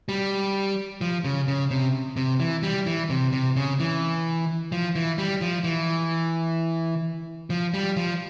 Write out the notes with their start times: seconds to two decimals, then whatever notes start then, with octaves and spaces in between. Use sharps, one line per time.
0.09 G3
1.01 F3
1.24 C#3
1.48 C#3
1.71 C3
2.16 C3
2.40 E3
2.63 G3
2.86 E3
3.10 C3
3.32 C3
3.56 C#3
3.80 E3
4.72 F3
4.95 E3
5.18 G3
5.41 F3
5.64 E3
7.50 F3
7.74 G3
7.97 F3